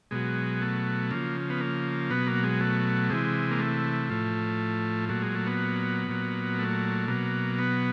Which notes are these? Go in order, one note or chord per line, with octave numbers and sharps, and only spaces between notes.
B2 F#3 G#3
A3
C#3 F3 A#3
B3
A#3
B2 F#3 B3
A#3
G#3
A3
C3 E3 G#3
A#3
A3
A2 F3
A#2 F#3 A3
G#3
A3
B3
A#2 F#3
A3
B2 F#3 A#3
B3